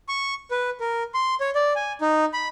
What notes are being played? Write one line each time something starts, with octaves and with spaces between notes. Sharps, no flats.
C#6
B4
A#4
C6
C#5
D5
G#5
D#4
B5